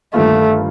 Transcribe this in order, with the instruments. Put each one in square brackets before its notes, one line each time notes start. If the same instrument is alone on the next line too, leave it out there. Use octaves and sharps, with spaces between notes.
[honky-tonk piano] G1 G2 D#3 A#3 F4 [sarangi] A3